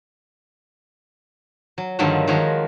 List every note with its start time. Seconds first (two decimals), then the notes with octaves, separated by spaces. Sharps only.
1.78 F#3
1.99 G2 D3 D#3 F3 F#3 A3
2.27 D#3 F3 G#3 F#4 C#5 A#5